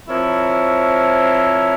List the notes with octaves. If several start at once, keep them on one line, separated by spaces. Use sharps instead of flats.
F3 C4 E4 A#4 C#5